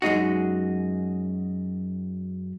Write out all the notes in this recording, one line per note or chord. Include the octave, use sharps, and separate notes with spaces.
F#2 G#3 D#4 F#4